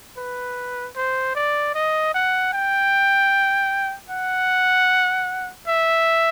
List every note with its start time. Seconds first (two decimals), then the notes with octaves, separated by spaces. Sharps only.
0.17 B4
0.96 C5
1.35 D5
1.75 D#5
2.14 F#5
2.53 G5
4.10 F#5
5.67 E5